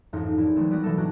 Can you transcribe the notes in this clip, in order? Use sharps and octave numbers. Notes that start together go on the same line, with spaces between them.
A1 F2 G#2 D#4 F6
A#1 E4
E3 F#3 G#3 A3 C4
G3 B3 F#4
B2 E3 A3 E4 A4 A#6
G#2 D4 D#4 F#4 G#5